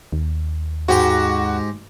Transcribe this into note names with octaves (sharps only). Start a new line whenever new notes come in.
D#2
G#2 F#4 G4 A#5